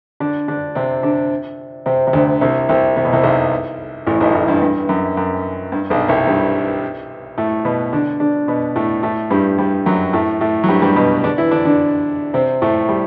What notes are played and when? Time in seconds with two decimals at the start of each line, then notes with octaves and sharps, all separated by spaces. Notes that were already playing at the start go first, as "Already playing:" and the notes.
0.20 D3 D4
0.48 D3 D4
0.75 C3 C4
1.03 D3 D4
1.86 C3 C4
2.07 C3
2.13 D2 D3
2.41 C2 C3
2.69 C2 C3
2.97 C3
3.05 B2
3.13 C2 C3
3.23 B1 B2
4.07 A1 A2
4.20 B1 B2
4.34 A1 A2
4.48 G2
4.62 G2
4.89 F#2
5.17 F#2
5.72 G2
5.90 B1 B2
6.08 C2 C3
6.27 G2 G3
7.38 A2 A3
7.65 B2 B3
7.93 D3 D4
8.20 D3 D4
8.48 B2 B3
8.76 A2 A3
9.03 A2 A3
9.31 G2 G3
9.58 G2 G3
9.86 F#2 F#3
10.13 A2 A3
10.41 A2 A3
10.64 F#3
10.68 G2 G3
10.82 G2 G3
10.96 B2 B3
11.24 D3 D4
11.38 E3 E4
11.51 D3 D4
11.65 D3 D4
12.34 C3 C4
12.62 A2 A3
12.89 G3